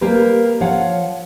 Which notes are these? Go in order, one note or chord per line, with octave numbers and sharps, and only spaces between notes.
G3 A#3 G4 B4
F3 C#5 F5 F#5